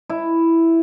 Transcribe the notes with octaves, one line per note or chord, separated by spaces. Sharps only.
E4